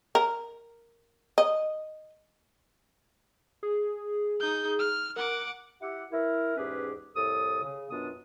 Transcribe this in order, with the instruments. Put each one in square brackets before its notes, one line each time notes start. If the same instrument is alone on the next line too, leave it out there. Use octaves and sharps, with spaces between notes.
[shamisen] A#4
D#5
[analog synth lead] G#4
[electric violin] D#4 G6
F6
[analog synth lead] A#4 [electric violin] F#5 D6
[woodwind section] E4 G4 F#5
E4 A#4
E2 G#2 C#4 G4 G#4 B4
C2 A2 A4 D#6
C#3
F#2 B2 B3 D4 F4 D#6